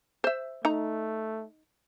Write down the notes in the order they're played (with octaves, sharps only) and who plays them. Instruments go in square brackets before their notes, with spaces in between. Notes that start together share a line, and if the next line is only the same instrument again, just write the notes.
[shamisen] C5 E5
[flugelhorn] A3 [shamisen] D#4 A#5